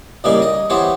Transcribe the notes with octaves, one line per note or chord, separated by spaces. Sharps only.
A2 C#3 G3 A#3 D#4 G#4
D#5
E3 B3 G4 C5 C#5